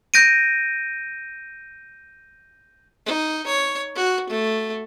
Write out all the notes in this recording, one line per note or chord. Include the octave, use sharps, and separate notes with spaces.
G6 A#6 D7 D#7
D#4
C#5
F#4
A3